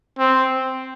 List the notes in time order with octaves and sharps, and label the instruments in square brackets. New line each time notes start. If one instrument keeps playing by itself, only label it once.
[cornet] C4